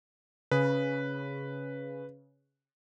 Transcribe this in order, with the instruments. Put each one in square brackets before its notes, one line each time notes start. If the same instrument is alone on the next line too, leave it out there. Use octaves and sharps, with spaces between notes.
[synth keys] C#3 [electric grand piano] B4